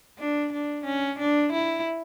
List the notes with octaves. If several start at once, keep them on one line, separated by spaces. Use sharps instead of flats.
D4
D4
C#4
D4
E4